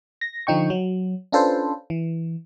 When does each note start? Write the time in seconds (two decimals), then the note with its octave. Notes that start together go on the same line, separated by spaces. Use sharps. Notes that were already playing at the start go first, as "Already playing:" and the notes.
0.21 A#6
0.47 D3 F3 D#4 G5 C#6
0.70 F#3
1.32 C#4 D4 F4 A4 B4 C5
1.90 E3